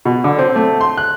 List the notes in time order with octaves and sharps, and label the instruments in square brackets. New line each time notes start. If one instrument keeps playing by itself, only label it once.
[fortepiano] B2
D3
C4
A3
C6
F#6